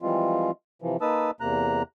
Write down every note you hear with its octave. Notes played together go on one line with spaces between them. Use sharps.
E3 F3 G3 G#3 C4 F4
C3 E3 F3
A#3 D#4 B4 A5 D#6 E6
E2 C3 A#3 A#5 F#6